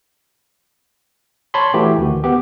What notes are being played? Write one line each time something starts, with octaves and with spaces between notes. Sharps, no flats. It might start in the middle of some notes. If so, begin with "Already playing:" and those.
C#5 A5 B5 C6
E3 A3 F#4 G4
D2 D#3 F#4
B3 G4